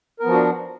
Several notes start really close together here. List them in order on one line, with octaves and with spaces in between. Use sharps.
A#4 B3 F3 F#4 D4